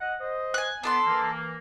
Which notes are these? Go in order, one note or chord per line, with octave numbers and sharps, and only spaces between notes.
D#5 F#5
C5 D#5
G#5 F#6
B3 D4 A4 C6
E3 A#3